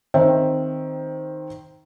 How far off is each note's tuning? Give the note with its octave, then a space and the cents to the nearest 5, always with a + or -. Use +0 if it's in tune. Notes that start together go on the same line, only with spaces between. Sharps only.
D#3 +0 C4 +0 E5 +0